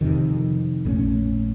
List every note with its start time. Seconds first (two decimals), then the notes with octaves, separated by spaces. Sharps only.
0.01 F2 C3 D#3
0.85 A#1 A2 A3 C#4